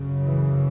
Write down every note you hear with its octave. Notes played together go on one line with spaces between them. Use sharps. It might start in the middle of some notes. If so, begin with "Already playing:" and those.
Already playing: F#2 C#3
E3